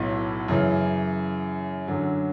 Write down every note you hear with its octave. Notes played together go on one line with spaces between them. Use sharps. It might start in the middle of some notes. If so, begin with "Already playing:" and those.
Already playing: B1 A2 F#3 B3
F#2 C#3 E3
F#2 D3 F#3